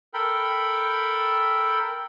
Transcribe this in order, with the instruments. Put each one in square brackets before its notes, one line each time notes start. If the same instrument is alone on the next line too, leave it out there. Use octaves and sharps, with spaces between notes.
[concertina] A4 A#4 G5 B5